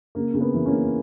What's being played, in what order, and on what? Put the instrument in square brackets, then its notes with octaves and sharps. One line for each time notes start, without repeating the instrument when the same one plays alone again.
[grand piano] C#3 A#3
C#3
B3
E3
A#3 C#4
C#3